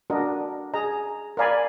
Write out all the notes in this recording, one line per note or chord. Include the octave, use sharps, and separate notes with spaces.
D4 F#4 A#4 D#5
G#4 D#5 A#5
A#4 D5 F5 G#5 B5